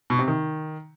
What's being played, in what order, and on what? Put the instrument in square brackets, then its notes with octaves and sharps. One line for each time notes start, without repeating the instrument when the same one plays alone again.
[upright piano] B2
C3
D#3